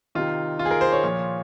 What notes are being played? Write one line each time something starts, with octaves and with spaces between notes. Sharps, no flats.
C3 D#3 F4
F4
G#4
A#4
C5
C#5
A#2 F3